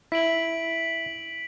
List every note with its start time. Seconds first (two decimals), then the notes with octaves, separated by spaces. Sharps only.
0.12 E4 B6 D7 F#7